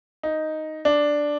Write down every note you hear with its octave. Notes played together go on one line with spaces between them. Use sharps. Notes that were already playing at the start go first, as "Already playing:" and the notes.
D#4
D4